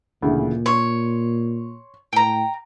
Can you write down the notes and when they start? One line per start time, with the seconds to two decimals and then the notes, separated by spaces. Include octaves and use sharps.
0.22 D2 A#2 C#3 E3
0.66 C#5 C6
2.13 A2 G5 A#5